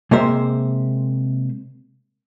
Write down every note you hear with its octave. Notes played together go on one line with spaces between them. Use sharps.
C3 G#3 A#3 C5 E5